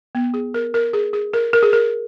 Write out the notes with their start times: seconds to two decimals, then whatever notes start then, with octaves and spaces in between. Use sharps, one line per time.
0.15 B3
0.34 G#4
0.54 A#4
0.74 A#4
0.93 G#4
1.13 G#4
1.34 A#4
1.53 A#4
1.63 G#4
1.73 A#4